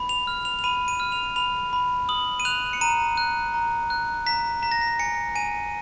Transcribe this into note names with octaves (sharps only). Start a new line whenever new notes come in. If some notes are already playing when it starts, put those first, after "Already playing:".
Already playing: B5
F7
F6
F7
F7
B5 D#7
D#7
F6
F7
B5 F7
B5
D#6 F#7
D#7
F#6 F7
C#7
A#5 D#7
F#6
A#5
F#6
A#5 B6
A#5 B6
A#6
B6
G#5 C#7
G#5 D#7